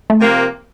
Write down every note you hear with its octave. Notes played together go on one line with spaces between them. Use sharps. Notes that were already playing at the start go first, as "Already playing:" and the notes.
A3
C3 F3 A#3